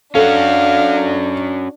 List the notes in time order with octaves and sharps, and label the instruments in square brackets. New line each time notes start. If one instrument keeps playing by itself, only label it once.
[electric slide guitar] C#4 F#4 [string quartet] D4 [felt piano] A4 [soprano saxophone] F5